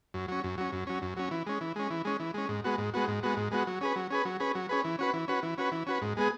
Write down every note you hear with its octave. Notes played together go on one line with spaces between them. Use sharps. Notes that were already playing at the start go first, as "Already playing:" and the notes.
F#2
F#3 C#4
F#2
F#3 C#4
F#2
F#3 C#4
F#2
F#3 C#4
E3
G#3 C#4
E3
G#3 C#4
E3
G#3 C#4
E3
G#3 C#4
G#2
G#3 B3 F#4
G#2
G#3 B3 F#4
G#2
G#3 B3 F#4
G#2
G#3 B3 F#4
F#3
C#4 G#4 B4
F#3
C#4 G#4 B4
F#3
C#4 G#4 B4
F#3
C#4 G#4 B4
E3
C#4 F#4 B4
E3
C#4 F#4 B4
E3
C#4 F#4 B4
E3
C#4 F#4 B4
G#2
G#3 B3 G#4